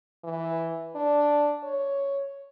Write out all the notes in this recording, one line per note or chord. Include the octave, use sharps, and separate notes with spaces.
E3
D4
C#5